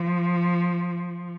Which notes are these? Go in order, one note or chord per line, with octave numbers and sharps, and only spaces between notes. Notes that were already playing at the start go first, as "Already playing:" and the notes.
Already playing: F3